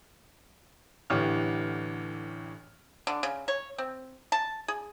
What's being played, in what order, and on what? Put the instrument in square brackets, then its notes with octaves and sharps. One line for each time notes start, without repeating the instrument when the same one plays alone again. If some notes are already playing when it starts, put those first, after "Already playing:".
[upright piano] A1 D3 E3 G4 C#5 F6
[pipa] D3
C#3
C#5
C4
A5
G#4